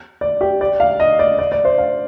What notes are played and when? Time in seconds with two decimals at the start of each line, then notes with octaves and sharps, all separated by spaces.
0.21 D5
0.41 G4
0.61 D5
0.80 F5
1.00 D#5
1.19 D5
1.39 D5
1.52 D5
1.65 C5
1.78 F5